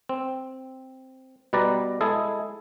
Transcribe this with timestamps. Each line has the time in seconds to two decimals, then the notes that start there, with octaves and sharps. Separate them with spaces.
0.09 C4
1.53 B2 G3 B4 D5 A#5
2.01 G#3 E4 G#4 A4